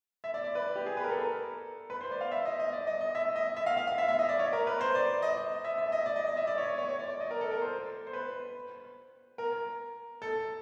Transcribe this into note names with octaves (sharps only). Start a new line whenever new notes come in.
E5
D5
D5
B4
G4
G#4
B4
A#4
A4
A#4
B4
C5
D5
F5
E5
D#5
D#5
D5
D#5
D#5
E5
D#5
E5
F5
F5
F5
E5
E5
D#5
D5
C#5
A#4
B4
C5
D5
D#5
E5
E5
D#5
D5
D#5
D#5
E5
D5
C#5
C#5
C#5
C#5
D5
D5
D#5
A#4
A4
A#4
C5
C5
B4
A#4
A4